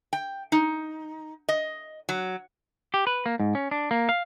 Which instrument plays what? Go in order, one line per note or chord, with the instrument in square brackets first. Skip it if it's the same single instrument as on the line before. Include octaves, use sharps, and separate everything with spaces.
[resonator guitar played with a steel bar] G5
D#4
D#5
F#3
[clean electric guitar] G4
B4
A#3
G#2
C#4
D4
A#3
F5